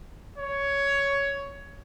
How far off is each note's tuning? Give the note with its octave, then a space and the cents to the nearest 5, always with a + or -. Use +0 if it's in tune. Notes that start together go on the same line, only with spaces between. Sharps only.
C#5 +10